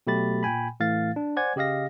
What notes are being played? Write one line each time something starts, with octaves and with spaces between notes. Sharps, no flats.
B2 F#3 A3 G4 B5 A6
A#2 G5 G#5 B5
A2 E3 A3 F5 A6
D4
C5 D5 F#5 G#5 G#6
C#3 G4 D#5 F5 A#6